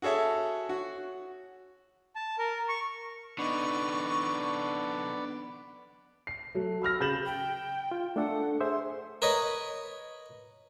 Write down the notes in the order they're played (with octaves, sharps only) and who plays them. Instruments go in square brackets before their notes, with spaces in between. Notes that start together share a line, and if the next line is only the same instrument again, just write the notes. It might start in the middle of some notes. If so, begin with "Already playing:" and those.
[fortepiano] F#4 G#4 A4 C#5 E5
F#4
[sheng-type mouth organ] A5
A#4
C#6
[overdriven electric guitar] D3 D#4 [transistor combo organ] B3 D5 [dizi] C#6
[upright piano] C7
F#3 A3
B5 E6 F6 A#6
C#3 B5 G6 A6 E7 F#7
[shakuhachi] G5
[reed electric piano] F4
[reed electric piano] A3 D4 A4 [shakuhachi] F#5
[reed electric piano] G#4 C5 E5 [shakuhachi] C6
[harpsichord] A#4 B4 C#5 D#5